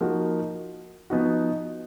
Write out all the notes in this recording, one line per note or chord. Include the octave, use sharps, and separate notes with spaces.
F3 A#3 D#4 F#4
F3 B3 D#4 F#4